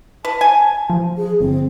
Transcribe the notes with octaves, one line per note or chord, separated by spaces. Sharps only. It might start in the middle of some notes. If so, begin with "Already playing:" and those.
B4 A5
G#5
F3
G#4
G1 C4